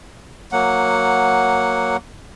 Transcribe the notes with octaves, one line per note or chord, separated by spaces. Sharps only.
F#3 A#3 F#5